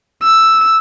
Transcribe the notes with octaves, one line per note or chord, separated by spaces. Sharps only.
E6